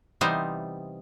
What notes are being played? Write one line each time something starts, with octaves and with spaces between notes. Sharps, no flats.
C3 E3 G3 B3 D#4 C5